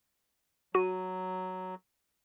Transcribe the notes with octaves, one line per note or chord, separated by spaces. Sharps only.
F#3 F#4 D#7